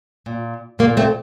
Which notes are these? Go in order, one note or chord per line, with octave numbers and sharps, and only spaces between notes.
A#2
A#2 A#3
A3 C4